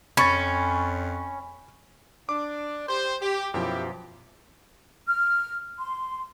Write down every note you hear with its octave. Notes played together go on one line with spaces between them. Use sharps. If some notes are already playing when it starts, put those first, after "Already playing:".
F2 C#4 B5 C#6 A6
D4 D6
G4 C5
G4
F#2 B2 F3 E4 G4
F6
C6